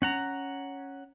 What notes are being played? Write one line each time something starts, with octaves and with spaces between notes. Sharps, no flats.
C#4 F#5 A#5